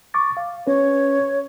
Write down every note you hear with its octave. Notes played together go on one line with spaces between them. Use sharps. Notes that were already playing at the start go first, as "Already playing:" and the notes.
C#6 D6 A6
F5
C#4 B4 C#5